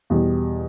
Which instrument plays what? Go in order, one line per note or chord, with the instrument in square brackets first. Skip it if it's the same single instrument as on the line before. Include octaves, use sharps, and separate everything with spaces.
[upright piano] E2 B2 G3